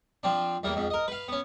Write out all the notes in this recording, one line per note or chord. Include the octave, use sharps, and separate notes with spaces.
F3 C4 D4
E2 G3 A#3
F2 G#2
A#4 D#5
B4 F5
B3 C#4